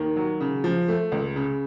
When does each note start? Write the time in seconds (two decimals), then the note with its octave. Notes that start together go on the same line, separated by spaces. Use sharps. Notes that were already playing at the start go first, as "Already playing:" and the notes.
Already playing: D#2 D#3
0.16 F#3
0.40 C#3
0.64 F3
0.88 A3
1.12 C#2
1.36 C#3